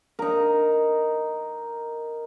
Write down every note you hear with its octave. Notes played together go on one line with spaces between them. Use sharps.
D#4 A#4